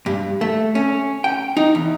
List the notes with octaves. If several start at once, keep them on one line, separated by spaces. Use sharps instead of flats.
G2
A3
C#4
G5
D#4
E2